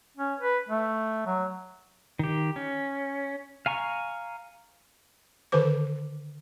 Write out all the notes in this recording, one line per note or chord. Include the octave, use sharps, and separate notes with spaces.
C#4
B4
A3
F#3
D#3 G4
C#4
F5 G#5 A#5 C#6
D3 D#3 B4 C5 D6